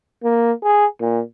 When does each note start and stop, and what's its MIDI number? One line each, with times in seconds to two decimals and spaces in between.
0.24 0.52 58
0.63 0.86 68
1.01 1.21 46